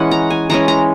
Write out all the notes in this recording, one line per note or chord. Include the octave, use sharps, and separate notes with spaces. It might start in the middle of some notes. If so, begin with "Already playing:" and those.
Already playing: E3 G#3 C#4 D#5 F#5
A#5
G#5
E3 G#3 C#4 A#5
A#5